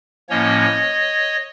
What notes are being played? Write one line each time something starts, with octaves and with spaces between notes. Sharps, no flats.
A2 F3 A#3 C#4 C#5 D#5